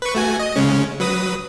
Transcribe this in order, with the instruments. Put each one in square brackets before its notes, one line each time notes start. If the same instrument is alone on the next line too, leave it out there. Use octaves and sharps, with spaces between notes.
[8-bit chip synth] B4 C#6
A3 F#4 G#5
D#5
C#3 G#3 C#4
F#3 B4 D#6